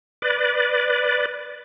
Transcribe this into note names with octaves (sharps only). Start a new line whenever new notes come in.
B4 D5